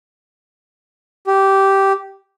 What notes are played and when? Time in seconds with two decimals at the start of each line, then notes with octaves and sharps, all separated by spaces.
1.27 G4